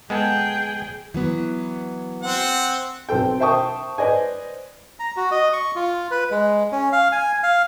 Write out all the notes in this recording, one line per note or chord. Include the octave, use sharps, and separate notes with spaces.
G#3 B3 G#4 A4 G5
E3 F#3 B3
C4 F#5
B1 C4 A4 G5
C5 E5 G5 A5 C#6 D#6
B4 C5 D5 D#5 G#5
A#5
F#4
D#5
C#6
F4
B4
G#3
C#4
F5
G#5
F5